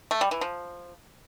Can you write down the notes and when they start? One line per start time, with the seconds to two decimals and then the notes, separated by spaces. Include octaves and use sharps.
0.11 A3
0.21 G3
0.31 E3
0.41 F3